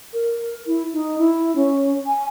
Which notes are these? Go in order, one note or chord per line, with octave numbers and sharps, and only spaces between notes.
A#4
E4
D#4
E4
C#4
G#5